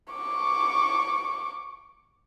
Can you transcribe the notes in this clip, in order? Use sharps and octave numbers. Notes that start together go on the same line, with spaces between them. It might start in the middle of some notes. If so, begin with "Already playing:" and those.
C#6 D6